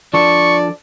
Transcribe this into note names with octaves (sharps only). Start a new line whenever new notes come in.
F3 D4 A4 D5 C#6